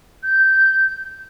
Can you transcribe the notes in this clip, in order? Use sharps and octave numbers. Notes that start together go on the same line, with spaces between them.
G6